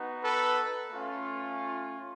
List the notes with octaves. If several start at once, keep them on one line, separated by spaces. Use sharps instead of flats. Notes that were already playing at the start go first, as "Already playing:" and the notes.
Already playing: B3 D#4 F#4
A4 B4
A3 C#4 F4